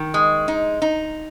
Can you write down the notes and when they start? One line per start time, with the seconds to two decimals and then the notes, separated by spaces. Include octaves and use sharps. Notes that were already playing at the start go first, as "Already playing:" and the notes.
Already playing: D#3
0.14 G#3
0.48 D#4
0.82 D#4